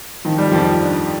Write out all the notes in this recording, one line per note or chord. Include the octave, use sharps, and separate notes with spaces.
D#3 F3
G3
F2 F3
D4